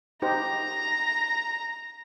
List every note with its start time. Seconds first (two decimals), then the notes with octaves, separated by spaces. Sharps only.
0.22 D#4 G4 C5 A#5